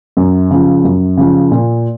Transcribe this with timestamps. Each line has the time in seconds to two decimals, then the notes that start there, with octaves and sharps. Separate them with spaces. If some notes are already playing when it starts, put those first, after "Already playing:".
0.17 F#2
0.51 C#3 F3
0.85 F#2
1.17 C#3 F3
1.51 A#2